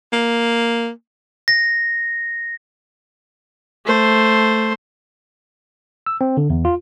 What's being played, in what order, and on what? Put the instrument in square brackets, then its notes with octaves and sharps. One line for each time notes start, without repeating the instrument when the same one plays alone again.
[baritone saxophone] A#3
[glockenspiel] A#6
[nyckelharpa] A3 C5
[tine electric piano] E6
C4
D3
E2
F4